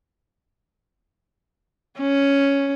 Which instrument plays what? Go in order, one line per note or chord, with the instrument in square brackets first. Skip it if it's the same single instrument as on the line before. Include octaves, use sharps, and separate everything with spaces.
[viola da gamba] C#4